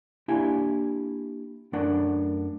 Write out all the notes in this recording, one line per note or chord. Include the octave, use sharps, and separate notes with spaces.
A#3 D4 E4 G4 F5 G#5
F#2 A3 D4 A#4 F#5